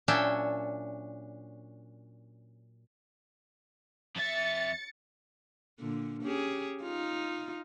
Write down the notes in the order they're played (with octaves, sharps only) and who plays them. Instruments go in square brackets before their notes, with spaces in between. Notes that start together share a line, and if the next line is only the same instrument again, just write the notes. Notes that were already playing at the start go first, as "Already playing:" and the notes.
[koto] A#2 F#3 C#4 D4 E5 G5
[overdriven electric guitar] F2 E5 [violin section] A6 C#7
[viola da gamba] A#2 D3
C#4 G4 G#4
D#4 F4